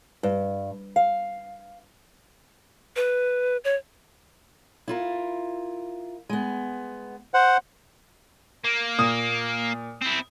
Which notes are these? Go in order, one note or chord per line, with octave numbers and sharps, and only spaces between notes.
G2
F5
B4
C#5
E4 F4 A#4
G#3 B3
C5 F#5
A#3
A#2 D#6
C4 E4